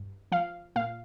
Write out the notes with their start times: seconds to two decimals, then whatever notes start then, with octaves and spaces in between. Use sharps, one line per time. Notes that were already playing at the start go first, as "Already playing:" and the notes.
Already playing: G2
0.32 F3 F5
0.76 A#2 F5